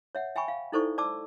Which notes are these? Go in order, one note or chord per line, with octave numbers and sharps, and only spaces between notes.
C#5 E5 F#5
E5 G5 G#5 B5 C#6
F5
D#4 E4 A4 C5 D5 C#6
D5 A5 D6 E6